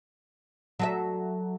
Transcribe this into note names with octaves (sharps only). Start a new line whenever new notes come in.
F#3 A4 E5